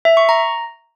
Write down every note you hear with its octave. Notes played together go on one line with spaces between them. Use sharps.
E5
C#6
A#5